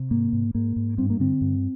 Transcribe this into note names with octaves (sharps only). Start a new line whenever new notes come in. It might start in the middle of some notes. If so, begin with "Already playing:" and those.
Already playing: C3
G#2 A#3
G#2
G#2 A#3
G#2
G2 C4
A#3
D3 C4
G2